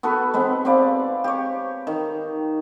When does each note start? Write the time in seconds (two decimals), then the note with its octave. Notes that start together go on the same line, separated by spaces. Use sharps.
0.03 B3 F#4 A4 B4
0.34 G#3 B3 C4
0.65 C4 B4 D5 F5
1.24 G4 C#5
1.87 D#3